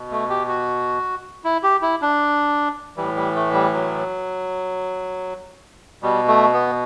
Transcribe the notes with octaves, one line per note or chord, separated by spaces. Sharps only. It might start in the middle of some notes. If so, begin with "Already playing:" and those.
Already playing: B2
A3
G4
F#4
E4
G4
E4
D4
A2 E3 G3
G3
A3
G3
F#3
B2 G3
A3
B3